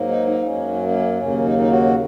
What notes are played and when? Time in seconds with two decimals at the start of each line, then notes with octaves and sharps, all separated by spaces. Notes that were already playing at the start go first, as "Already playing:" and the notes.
Already playing: G#2 F#3 A#3
0.09 D#4
0.27 D#4
0.45 F#2 F#3 A#3 C#4
0.83 A#3
1.19 D#2 C#3 F#3 A#3 C#4
1.45 D#4
1.59 D#4
1.70 F#4